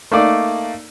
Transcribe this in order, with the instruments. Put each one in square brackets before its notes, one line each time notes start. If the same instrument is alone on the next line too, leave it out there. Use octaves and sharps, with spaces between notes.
[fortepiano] A3 A#3 D#4 D5